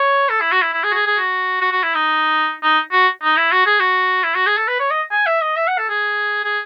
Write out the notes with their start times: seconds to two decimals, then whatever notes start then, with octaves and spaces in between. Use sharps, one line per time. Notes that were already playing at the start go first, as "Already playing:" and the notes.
Already playing: C#5
0.29 A4
0.41 E4
0.52 F#4
0.62 E4
0.73 E4
0.84 G#4
0.91 F#4
0.95 G#4
1.07 G#4
1.17 F#4
1.61 F#4
1.71 F#4
1.83 E4
1.95 D#4
2.63 D#4
2.92 F#4
3.23 D#4
3.37 E4
3.52 F#4
3.66 G#4
3.80 F#4
4.24 E4
4.35 F#4
4.46 G#4
4.57 A4
4.68 B4
4.80 C#5
4.91 D#5
5.12 G#5
5.26 E5
5.41 D#5
5.57 E5
5.67 F#5
5.78 A4
5.89 G#4
6.44 G#4